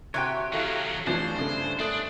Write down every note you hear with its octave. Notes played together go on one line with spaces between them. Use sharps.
C3 F#4 G4 C#5 G5
D#3 F#3 E4 A4 F5
F1 E3 F3 D4 C5 C#5
G2 C#3 A3
A3 D4 D#6 F#6